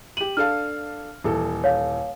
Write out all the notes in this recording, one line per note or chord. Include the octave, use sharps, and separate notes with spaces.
G4 D#7 F#7
D4 A4 F5 F6
D#1 E3 A4
C#5 F5